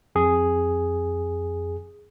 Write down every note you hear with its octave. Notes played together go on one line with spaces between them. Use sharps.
F2 G#4